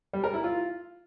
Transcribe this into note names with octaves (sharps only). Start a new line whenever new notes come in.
G3
A#4
E4
F4